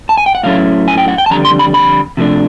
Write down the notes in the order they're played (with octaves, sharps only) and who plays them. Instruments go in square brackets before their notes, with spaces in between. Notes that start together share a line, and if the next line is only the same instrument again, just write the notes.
[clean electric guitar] A5
G#5
G5
F#5
A2 F#3 A3 C#4 E4 F5
G#5
G5
F#5
G5
A5
F2 D3 G3 A#5
C6
B5
B5
C3 F3 A3 D4